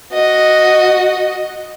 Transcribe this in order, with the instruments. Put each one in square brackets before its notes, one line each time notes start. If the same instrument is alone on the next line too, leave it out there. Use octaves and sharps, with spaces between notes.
[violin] F#4 D#5